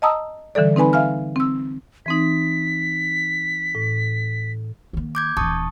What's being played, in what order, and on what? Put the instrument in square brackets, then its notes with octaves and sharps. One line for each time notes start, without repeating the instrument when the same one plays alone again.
[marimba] D#5 G5 A5 A#5 D#6 E6
D3 E3 G3 A4 D5
C4 D#4 B4 G#5 B5
E5 F5 G#5 F6
C4 E6
[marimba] E3 C4 D#4 [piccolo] B6
[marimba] A2
[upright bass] D#3 A#3
[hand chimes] D6 G6 G#6
[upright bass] D#1 E3 [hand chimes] A5 C#6 D#6